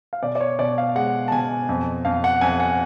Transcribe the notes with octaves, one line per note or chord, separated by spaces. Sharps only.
F5
B2 D5
D5
C#5
B2 D5
F5
G#3 F#5
A5
B2 G#5
F2
F2 F5
F#5
F2 G#5
F#5